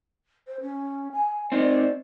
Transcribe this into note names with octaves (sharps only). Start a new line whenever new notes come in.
C5
C#4
G#5
C4 D#4 D5